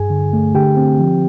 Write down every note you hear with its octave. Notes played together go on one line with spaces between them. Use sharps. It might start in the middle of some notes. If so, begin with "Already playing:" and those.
Already playing: G2 G#4 G#5
D3
A3
D3 G4 G5
C4
F3